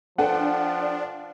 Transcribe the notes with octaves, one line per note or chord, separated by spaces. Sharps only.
F3 D4 A4 B4 F#5 G5